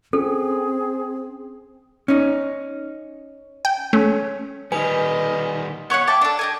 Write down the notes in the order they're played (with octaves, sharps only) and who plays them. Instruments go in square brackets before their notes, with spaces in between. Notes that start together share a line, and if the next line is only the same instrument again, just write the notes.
[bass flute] C4 [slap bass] C#4 [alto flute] G#4 [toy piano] A4
[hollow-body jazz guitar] C#4 D#4
[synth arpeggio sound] G5
[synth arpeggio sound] A3 [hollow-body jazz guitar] C#4
[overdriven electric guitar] D#3 G3 [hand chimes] B4 [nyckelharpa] D#5 [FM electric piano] G#5
[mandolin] B3 C#5 E5 F#5
E5 G5 A5 D6
D4 A4
G4 D#5 G#5